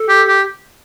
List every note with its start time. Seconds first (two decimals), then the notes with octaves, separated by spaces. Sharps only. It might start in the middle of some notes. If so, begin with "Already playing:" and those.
Already playing: A4
0.08 G4
0.28 G4